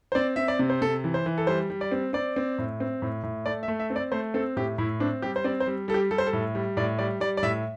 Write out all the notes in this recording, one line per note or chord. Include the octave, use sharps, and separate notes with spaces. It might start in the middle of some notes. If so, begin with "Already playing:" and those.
C5
C4 D5
C4 E5
D5
C3
C5
C3 A4
E3
C5
E3
A4
G3 C5
G3
D5
C4
C4 D5
C4
A2
C4
A2
A2
A3 D5
E5
A3
E5
C4
D5
A3 C5
C4 A4
A2 G4
A2 E4
C4 D4
G3 G4
C5
C4 D5
C5
G3
G3 A4
G4
G3 A4
C5
A4
A2
G3
A2 D5
G3 D5
G3 D5
D5
A2 E5